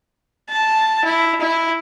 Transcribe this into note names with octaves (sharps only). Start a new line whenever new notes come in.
A5
E4
E4